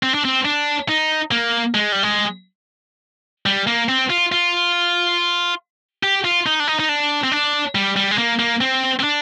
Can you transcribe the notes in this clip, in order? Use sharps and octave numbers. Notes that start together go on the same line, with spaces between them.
C4
D4
C4
D4
D#4
A#3
G#3
G3
G#3
G3
A#3
C4
F4
F4
G4
F4
D#4
D4
D#4
D#4
D4
C4
D4
G3
G3
G#3
A#3
A#3
C4
C4
D4